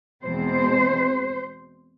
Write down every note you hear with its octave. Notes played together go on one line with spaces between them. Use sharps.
E2 B2 G#3 C4 C5